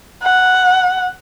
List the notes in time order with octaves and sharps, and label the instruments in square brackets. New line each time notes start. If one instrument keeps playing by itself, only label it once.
[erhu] F#5